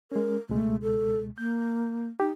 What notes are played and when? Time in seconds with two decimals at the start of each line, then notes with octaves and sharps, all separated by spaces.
0.12 G#3 C#4 A#4
0.49 C#2 B2 G#3 A3
0.82 A4
1.38 A#3 G6
2.20 D#4 G4